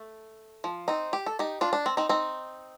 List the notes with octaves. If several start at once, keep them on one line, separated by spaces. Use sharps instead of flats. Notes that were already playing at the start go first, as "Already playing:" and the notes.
Already playing: A3
F3
C4 D#4
G4
A4
D#4 G4
D4 F4
D4
C4
C4 D#4
C4 D#4